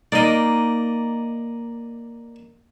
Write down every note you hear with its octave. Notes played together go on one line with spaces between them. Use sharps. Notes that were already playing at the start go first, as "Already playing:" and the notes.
A#3 D#4 D5 D#5